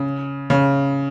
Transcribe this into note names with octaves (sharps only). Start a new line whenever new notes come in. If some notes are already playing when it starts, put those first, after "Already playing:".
Already playing: C#3
C#3